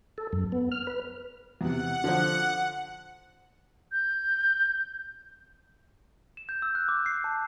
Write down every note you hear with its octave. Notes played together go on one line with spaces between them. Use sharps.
A4
F#2
B3
F6
B4
E2 C3 F#5
D3 F3 C5
G6
E7
G6
E6
F#6
D6
C7
A5